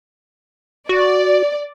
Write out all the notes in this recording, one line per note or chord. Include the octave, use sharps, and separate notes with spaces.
F#4 D5